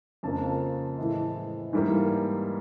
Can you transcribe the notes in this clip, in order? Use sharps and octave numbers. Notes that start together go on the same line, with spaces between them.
F2 C#3 F3 A#3 A5
A2 E3 G#3
G#2 E3 G3 A#3